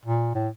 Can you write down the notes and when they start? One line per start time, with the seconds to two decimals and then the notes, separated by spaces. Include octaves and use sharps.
0.06 A#2
0.35 A2